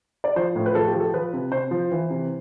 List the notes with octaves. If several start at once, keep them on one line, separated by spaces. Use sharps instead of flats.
D5
F3 C5
A2
B4
F3 A4
G4
F3
A4
F3 B4
C3
C3 C5
F3
E3
C3